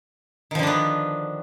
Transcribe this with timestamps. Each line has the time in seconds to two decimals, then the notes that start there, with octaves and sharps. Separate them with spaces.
0.51 D#3
0.55 F3
0.59 D3
0.63 D4
0.67 B3